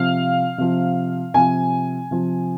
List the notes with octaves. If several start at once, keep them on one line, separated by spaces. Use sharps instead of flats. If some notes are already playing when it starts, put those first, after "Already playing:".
Already playing: C3 F3 F5
C3 F3
C3 F3 G#5
C3 F3